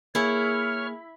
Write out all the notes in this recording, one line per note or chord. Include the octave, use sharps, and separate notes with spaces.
A#3 E4 G#4 C#5 C#6 F6